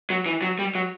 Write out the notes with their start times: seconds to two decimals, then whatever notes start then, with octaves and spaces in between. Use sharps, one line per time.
0.10 F#3
0.26 E3
0.42 F#3
0.59 G3
0.75 F#3